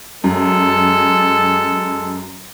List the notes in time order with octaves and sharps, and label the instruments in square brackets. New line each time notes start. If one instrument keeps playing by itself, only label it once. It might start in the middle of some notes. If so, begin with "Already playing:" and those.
[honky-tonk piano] F#2 [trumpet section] G#3 A4